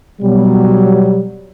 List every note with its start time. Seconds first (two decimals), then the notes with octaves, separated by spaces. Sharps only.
0.22 B2 F#3 G3